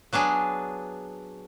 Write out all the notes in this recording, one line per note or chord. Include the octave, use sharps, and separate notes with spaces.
F#3 B3 D4 G#4